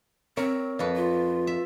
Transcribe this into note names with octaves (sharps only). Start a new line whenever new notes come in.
C4 A#4 C#5 E5
F2 B4
F4
E5